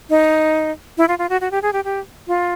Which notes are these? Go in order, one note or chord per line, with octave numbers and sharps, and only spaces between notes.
D#4
E4
F4
F4
F#4
F#4
G4
G#4
G4
G4
F4